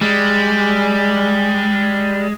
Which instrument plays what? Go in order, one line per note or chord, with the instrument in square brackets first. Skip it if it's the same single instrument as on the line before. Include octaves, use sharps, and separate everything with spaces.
[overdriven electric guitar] G3 [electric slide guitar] G#3